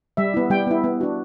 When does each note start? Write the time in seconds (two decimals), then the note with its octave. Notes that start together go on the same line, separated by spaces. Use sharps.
0.17 G3 E5
0.34 B3 E4
0.50 G3 G5
0.67 B3 E4
0.84 B3
1.00 D4 F#4